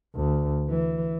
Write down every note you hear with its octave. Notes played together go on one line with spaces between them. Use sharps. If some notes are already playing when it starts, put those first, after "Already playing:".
D2
E3